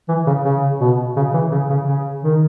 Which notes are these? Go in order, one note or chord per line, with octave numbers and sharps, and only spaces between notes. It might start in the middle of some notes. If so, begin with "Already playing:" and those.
E3
C#3
C#3
B2
C#3
E3
C#3
C#3
C#3
D#3